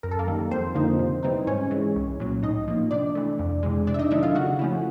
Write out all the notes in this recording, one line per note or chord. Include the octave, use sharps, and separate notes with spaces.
F#2 A#4
A4
A#3 A#4
D#3 G3
F2 C4 C5
D3 F3 A#3 D#4
C3
E3 G3 C4 D#4
G#2 C#4 C#5
E3 G#3
C2
A#2 F#3
A2 D#4 D#5
F3 A#3
C3 D4 D5
E3 A3
F2
C3 E3 G#3
C3 D4 D5
E5
D#4 D#5
D#3 F#3 A3 D4 E4 E5
F4 F5
C#3 F#4 F#5
F3 A3 C#4 E4